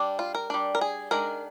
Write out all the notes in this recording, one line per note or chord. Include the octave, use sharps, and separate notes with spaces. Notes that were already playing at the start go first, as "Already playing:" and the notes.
Already playing: G3 D4
F4
A#4
G3 D4
A#4
G#4
D#3 G#3 D4 A#4